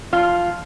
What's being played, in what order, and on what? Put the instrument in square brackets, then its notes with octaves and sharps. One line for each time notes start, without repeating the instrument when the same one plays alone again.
[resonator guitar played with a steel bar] F3 F4